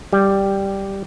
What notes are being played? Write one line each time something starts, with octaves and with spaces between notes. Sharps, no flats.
G3